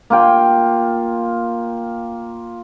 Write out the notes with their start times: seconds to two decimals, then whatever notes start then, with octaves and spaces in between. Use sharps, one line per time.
0.10 A#3 F4 G5